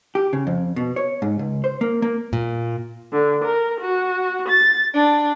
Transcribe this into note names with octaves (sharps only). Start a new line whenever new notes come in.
G4
C#3
F2
B2
C#5
G#2
C#2
C5
A#3
A#3
A#2
D3
A#4
F#4
A6
D4